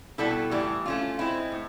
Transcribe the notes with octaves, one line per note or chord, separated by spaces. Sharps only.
B2 G3 B3 E4 A4
A2 E3 G3
A3 C#4 F4
G#3 C4 E4
A2